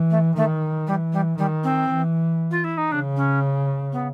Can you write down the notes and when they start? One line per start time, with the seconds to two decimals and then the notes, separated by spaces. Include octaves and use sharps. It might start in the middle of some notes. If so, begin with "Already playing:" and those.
Already playing: E3
0.11 A3
0.36 D#3 A3
0.87 E3 G3
1.13 G3
1.38 D#3 G3
1.63 C4
1.89 E3
2.51 F4
2.64 E4
2.77 D#4
2.91 C#3 D4
3.16 C#4
3.92 B3